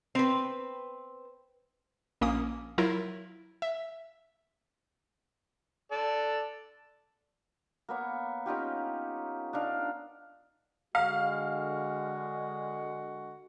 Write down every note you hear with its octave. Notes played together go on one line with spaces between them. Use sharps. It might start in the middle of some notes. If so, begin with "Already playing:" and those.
C4 B4
A#1 A#3 C#4 D#6
F#3 E4 F4 A#4
E5
A4 D5
A#3 B3 C#5 D6
C#4 D#4 F4 G4
D4 D#4 F5
D3 G#3 F#4 F5